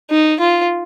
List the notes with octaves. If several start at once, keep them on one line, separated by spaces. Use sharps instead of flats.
D#4
F4